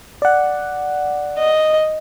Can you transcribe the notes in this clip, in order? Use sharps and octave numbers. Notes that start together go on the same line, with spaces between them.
D5 F#5
D#5